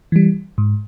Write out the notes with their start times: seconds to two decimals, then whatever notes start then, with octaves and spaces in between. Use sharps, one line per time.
0.12 E3 G3
0.58 G#2